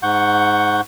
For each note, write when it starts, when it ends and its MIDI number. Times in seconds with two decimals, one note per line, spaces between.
0.03 0.81 44
0.03 0.81 78
0.03 0.81 85
0.03 0.81 91